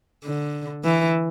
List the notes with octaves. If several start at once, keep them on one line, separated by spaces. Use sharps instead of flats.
D3
E3